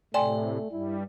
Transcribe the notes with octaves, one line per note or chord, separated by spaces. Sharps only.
A2 C3 A3 D5 G5 G#5 C6
G2 G3 E4